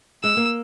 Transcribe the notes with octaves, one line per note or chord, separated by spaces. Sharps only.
G#3 E6
A#3